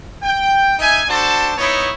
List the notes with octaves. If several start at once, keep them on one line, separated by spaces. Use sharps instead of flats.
G5
D#4 E5 G#5
D4 F#4 A4 C5 A5
B3 D#4 E4 C#5